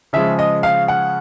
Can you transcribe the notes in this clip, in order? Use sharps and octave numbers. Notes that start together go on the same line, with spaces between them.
C#3 F3 G#3 E5
D#5
F5
F#5